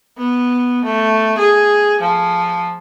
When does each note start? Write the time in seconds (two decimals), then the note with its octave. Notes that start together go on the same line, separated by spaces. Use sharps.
0.18 B3
0.85 A3
1.38 G#4
2.01 F3